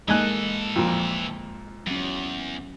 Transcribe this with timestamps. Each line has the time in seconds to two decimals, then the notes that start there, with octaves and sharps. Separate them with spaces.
0.08 E3 G#3 A#3 D#4 A4 G#5 F#6
0.76 F2 A#2
1.87 E2 F#3 C#4